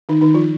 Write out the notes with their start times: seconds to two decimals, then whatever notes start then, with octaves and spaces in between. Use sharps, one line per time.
0.09 D#3 D#4
0.21 D#3 D#4
0.34 F3 F4